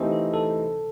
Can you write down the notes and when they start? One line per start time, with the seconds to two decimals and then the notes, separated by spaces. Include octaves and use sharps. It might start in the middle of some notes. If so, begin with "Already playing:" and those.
Already playing: E3 A3 C4 D#4 G4 C5
0.12 A4
0.34 A4